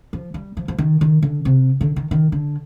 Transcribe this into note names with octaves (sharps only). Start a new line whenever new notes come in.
F3
G3
F3
F3
D#3
D#3
D3
C3
D3
D#3
D#3
D3